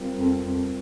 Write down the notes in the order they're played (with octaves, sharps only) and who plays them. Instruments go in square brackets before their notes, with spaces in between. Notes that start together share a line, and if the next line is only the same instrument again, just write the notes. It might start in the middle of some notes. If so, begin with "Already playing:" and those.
Already playing: [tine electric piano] G3 C4 F4 A#4
[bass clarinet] F2
F2